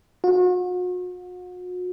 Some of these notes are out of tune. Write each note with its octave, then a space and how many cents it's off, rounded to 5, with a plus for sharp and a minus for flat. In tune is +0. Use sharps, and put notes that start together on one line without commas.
F#4 -40